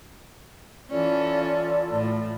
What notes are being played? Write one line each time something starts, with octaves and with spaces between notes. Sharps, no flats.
E3 C#4 F4 A4 D5
A2